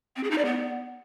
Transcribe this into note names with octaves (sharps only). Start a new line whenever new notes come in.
C4
G#4
D#4
D5
B3